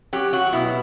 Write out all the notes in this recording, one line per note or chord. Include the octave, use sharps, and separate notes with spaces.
F#3 G4
F#3 F#4
B2 E4